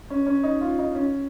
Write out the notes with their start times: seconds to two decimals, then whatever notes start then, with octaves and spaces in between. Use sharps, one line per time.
0.10 C#4
0.27 C#4
0.43 D#4
0.61 F4
0.79 D#4
0.95 C#4